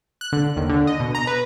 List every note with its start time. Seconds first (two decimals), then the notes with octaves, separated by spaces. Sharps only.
0.21 F#6
0.32 D3
0.57 D#2
0.70 D3
0.87 D#5
1.00 B2
1.15 A#5
1.27 B4